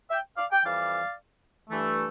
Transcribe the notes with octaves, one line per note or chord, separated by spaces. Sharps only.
E5 G5
D5 F5
G5
F2 E3 G3 D5 F5
G2 E3 A3